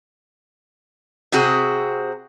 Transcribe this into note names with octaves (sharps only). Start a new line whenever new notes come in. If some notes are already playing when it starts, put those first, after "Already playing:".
C3 C4 F#4 G#4